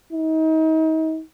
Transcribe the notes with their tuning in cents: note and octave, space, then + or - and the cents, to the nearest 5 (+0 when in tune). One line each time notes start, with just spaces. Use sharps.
D#4 +35